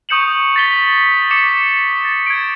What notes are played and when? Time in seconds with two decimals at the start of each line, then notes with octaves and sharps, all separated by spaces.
0.09 C#6 D#6 G6 C#7 E7 F#7
0.56 A6 B6 G7
1.31 D6 C#7 E7
2.05 A6
2.26 G#6 D7